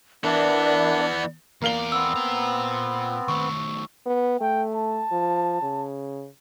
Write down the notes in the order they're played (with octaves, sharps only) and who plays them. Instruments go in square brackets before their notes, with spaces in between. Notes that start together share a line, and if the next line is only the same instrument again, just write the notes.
[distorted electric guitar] E3 B3 [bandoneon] D4 [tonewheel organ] A#4 E5 F#5 [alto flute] D5
[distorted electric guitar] E2 D5 [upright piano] A#3 F5 G7
[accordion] B3 C4 [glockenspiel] E6
[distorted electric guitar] A#2 A#5
[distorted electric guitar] D#3 A3 [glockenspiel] C#6
[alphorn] B3
[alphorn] A3 [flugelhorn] G5
[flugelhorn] A5
[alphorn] F3
C#3